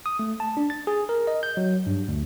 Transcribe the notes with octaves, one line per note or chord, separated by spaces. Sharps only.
D#6
A3
A5
D4
A6
G#4
A#4
D#5
G6
F#3
G2
D2